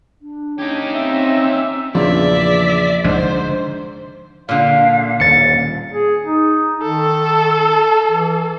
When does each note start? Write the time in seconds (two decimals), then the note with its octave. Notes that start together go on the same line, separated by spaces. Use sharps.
0.22 D4
0.58 C#4 D#4 G4 G#6
0.94 C4 E5
1.95 E2 A#2 C#3 F3 D4 D5 E5
3.05 G#2 D3 C5
4.49 A#2 D3 F5
5.20 D#1 A6 C#7
5.93 G#4
6.25 D#4
6.82 D#3 A4
8.08 E3